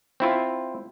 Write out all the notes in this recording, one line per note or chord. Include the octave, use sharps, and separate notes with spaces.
C4 E4 F4